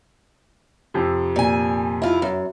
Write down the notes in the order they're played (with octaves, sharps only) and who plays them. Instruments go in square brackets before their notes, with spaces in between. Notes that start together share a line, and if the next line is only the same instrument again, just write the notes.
[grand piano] F2 C3
[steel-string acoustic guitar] A#2 G#5
E4 F4
F#2